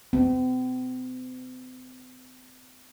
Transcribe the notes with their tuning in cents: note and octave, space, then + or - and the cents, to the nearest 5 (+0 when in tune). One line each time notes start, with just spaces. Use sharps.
C4 -45